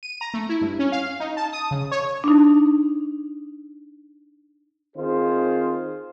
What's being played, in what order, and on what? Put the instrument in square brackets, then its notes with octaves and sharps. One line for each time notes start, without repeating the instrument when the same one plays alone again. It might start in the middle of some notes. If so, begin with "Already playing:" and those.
[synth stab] D#7
A#5
A3
E4
G2
C#4
F5
D#4
A5
D#6
C#3
C#5
[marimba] D4 D#4
[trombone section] D#3 C4 F4 G#4 C5